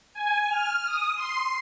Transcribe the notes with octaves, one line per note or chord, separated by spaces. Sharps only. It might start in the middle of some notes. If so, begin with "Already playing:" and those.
G#5
F6
D#6
C6